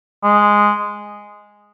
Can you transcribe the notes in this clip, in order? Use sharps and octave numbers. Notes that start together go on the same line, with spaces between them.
G#3